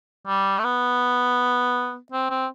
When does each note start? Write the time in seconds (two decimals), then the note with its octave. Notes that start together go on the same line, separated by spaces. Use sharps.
0.27 G3
0.59 A3
0.64 B3
2.12 C4
2.30 C4